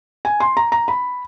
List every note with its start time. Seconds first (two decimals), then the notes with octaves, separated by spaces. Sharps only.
0.25 G#5
0.40 C6
0.57 A#5
0.72 A#5
0.88 B5